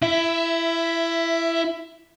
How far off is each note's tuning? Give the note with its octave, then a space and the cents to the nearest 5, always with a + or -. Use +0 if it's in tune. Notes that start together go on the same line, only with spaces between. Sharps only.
E4 +20 E5 +0